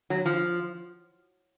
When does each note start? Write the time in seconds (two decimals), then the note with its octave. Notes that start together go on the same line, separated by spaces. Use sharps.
0.10 F#3
0.26 F3